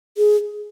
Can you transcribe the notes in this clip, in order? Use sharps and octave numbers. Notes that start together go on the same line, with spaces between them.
G#4